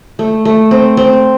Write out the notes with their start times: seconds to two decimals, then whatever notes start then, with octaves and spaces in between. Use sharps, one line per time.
0.19 A3
0.45 A3
0.71 C4
0.97 C4